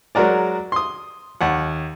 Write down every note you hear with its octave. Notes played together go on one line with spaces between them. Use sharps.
F#3 G#3 F#4 A#4 D5
C6 D#6
D#2 F#5